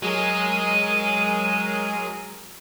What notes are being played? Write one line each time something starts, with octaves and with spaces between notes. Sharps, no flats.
F#3 G#3 G#4 A#4 D#7